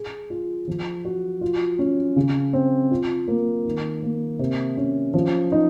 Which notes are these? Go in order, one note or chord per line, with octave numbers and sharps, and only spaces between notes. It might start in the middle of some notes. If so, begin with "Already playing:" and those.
Already playing: G#4
F4
F3
F#4
F4
C#4
C#3
C4
F4
A#3
D#3
A#3
C3
C#4
F3
D#4